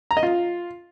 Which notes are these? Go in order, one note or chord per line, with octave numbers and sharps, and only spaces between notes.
A#5
D#5
F4